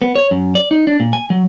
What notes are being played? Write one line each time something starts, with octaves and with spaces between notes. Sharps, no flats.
B3
C#5
F#2
D5
D#4
D4
A#2
G#5
F#3